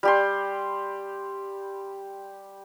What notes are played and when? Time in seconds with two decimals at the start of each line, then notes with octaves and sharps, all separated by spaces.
0.03 G3 G4 C6